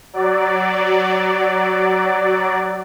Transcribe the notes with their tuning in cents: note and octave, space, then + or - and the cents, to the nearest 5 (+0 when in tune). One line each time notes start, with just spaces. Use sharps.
F#3 +20 D5 +0